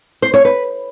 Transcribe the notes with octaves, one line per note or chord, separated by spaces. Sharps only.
C5
C#5
B4